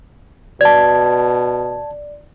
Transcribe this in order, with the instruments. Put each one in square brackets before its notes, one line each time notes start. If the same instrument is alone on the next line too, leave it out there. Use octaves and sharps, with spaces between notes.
[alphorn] B2 [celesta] D5 [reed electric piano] A5 G#6